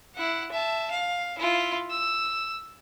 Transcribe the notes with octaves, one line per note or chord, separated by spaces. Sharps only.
E4 F#5
E5 A5
F5
E4 F4
E6